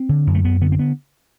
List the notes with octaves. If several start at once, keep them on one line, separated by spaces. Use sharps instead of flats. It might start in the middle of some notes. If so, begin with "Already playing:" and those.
Already playing: C4
D3
F#2
A3
F#2 B3
D3 B3
C4
B3